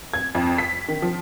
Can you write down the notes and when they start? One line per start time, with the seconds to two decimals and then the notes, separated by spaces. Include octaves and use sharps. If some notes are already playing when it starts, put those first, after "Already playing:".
0.14 G#6
0.35 F2
0.58 B6
0.88 D#3
1.02 F3